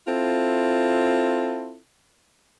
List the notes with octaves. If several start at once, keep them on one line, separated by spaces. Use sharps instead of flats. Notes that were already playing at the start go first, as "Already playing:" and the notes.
C4 E4 F4 A4